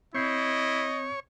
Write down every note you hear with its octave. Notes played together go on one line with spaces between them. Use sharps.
C4 E4 C#5 D#5 G6 C7